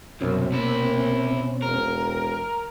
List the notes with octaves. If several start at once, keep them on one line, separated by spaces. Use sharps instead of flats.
C2 F#2 B2 C4 C#4
C3 A#3 E4
E1 A#4